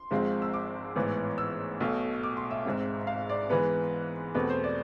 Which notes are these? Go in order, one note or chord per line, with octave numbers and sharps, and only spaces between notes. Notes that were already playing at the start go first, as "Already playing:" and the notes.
Already playing: C6
G#1 G#2 F3 G#3 C4
E6
D6
A1 G#2 E3 B3
E6
B1 B2 A3
D6
C6
E5
G#1 G#2 G#3 C4
F5
D5
G#2 E3 G#3 B3 B4
E2 B2 A3 C4 B4
C5
D5